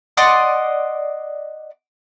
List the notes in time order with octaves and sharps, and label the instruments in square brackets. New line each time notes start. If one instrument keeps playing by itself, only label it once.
[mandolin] D5 D#5 F#5 C6